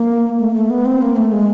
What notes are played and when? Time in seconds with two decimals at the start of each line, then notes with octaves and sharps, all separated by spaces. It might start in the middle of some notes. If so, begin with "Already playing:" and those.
Already playing: A#3
0.39 A3
0.49 A#3
0.54 A3
0.70 B3
0.85 C4
1.02 A#3
1.16 A3
1.32 G#3